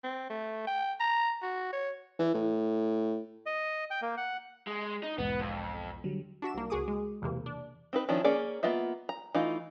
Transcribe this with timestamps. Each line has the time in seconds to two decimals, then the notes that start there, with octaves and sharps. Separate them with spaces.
0.04 C4
0.30 A3
0.67 G5
1.00 A#5
1.42 F#4
1.73 C#5
2.19 E3
2.35 A2
3.46 D#5
3.91 G5
4.02 A#3
4.17 F#5
4.67 G#3
5.03 D#4
5.18 B1 E2 G#2 B3
5.41 F2
6.04 D3 F#3 G3
6.42 D4 F#4 E5 E7
6.54 C2 A#3
6.70 C#2 F#4 G#4 D6 D#6
6.88 G#3
7.22 B1 E2 C3 A#3
7.46 D4
7.93 C4 D#4 B4
8.09 D#3 F3 C#4 D4 E4
8.24 A#3 C#4 G#4 D5
8.63 A#3 B3 F4 D#5 E5
9.09 A#5
9.35 E3 A3 D#4 F4